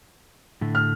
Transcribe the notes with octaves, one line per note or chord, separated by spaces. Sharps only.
A2 D3 A3
F6